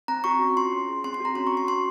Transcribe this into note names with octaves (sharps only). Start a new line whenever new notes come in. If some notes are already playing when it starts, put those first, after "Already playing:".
C4 A#5
F#4 C#6
C#4
F4 C6
C#4
G#4
C4 C6
C6
F#4 A#5
C#4 C6
C#6
F#4
C6
C#4 C6